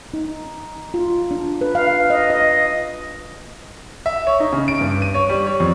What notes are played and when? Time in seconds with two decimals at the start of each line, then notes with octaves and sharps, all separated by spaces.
0.14 D#4
0.94 F4
1.31 D4
1.61 B4
1.75 F5
2.10 D#5
2.30 D#5
4.06 E5
4.27 C#5
4.40 D#4
4.53 C#3
4.68 D7
4.81 G2
5.02 D#7
5.14 C#5
5.29 G3
5.47 C#5
5.60 F2